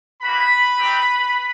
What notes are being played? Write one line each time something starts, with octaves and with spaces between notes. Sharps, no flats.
A#3 D#4 F#4 B4 B5
C4 D#4 G4